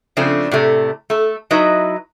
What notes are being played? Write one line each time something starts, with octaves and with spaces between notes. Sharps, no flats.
C#3 F3 A3 C4 D4
A2 C3 A3
A3 A4
F#3 D#4 E4 B4 D#5 E5